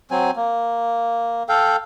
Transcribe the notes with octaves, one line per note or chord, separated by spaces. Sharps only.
F#3 C4 G#5
A#3
A4 F5 G5